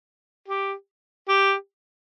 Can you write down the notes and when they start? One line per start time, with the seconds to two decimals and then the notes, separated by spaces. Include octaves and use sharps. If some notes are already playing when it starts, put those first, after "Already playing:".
0.48 G4
1.28 G4